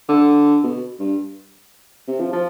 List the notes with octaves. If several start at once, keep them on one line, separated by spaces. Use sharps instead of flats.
D3
B2
G2
C3
F3
F3